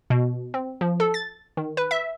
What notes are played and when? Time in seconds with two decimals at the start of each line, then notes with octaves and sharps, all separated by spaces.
0.10 B2
0.54 C4
0.81 F3
1.00 A4
1.14 A6
1.57 D#3
1.77 B4
1.91 E5